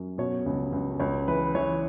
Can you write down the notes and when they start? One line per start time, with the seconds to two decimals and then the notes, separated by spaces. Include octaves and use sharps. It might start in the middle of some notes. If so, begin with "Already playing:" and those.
Already playing: F#2
0.18 B2 C#5
0.46 C#2
0.72 C#2
1.00 C#2 C#5
1.28 E3 B4
1.55 E3 C#5